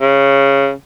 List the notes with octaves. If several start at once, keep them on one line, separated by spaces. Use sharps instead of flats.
C#3